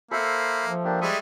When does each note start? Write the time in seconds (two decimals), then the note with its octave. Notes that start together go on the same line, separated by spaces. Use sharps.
0.11 A#3 A4 C5 E5 B5
0.66 F3
0.84 A#3 D4 G4
1.01 G3 G#3 E5 C#6 D#6